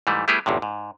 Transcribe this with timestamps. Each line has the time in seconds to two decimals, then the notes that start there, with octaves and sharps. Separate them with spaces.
0.07 G#2 E3 G3 A3
0.28 G3 A3 B3 E4 G4 G#4
0.46 G1 E2 A2 C3
0.62 G#2